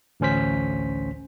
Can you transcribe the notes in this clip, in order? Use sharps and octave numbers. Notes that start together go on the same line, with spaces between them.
A1 D2 C#4 C5 B6